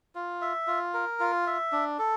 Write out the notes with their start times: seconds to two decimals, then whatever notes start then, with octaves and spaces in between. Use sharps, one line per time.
0.15 F4
0.41 E5
0.67 F4
0.94 A#4
1.20 F4
1.47 E5
1.72 D4
1.99 A4